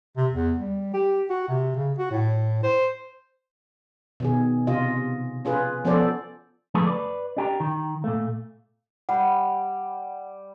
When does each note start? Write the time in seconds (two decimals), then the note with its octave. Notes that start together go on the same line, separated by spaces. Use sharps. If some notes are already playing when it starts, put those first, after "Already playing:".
0.17 C3
0.33 E2
0.58 G3
0.94 G4
1.30 F#4
1.48 C3
1.76 C#3
1.98 F#4
2.11 A2
2.63 C5
4.20 B2 D#3 G#4
4.67 C3 F4 D#5
5.45 C#4 F4 G#4 B4
5.85 F3 B3 C#4 A4 C5 D5
6.74 D3 F3 A3 G#4 A4 B4
6.86 B4 D5
7.37 D4 G4 A#4
7.60 D#3
8.04 A#2 A3
9.09 G3 F#5